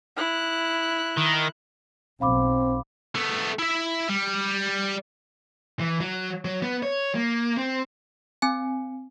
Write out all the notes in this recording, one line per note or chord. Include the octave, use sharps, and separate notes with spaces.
E4 F#6
D#3
B1 C4 F5 B5 D6
A3 B3
E4 E5
G3
E3
F#3
F#3
B3
C#5
A#3
C4
C4 G#5